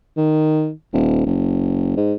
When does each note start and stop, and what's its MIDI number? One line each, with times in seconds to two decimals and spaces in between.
0.17 0.71 51
0.93 1.24 27
1.26 1.97 30
1.97 2.14 44